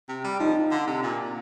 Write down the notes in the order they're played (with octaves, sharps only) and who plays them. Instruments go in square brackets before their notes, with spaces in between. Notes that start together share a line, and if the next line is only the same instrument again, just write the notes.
[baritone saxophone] C3
G3
[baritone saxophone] F3 [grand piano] D#4
[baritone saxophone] D3
C3
A#2